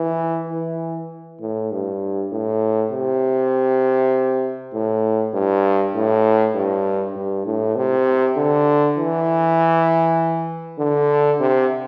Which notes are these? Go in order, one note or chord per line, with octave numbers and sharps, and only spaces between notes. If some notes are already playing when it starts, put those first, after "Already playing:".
Already playing: E3
E3
A2
G2
A2
C3
A2
G2
A2
G2
G2
A2
C3
D3
E3
D3
C3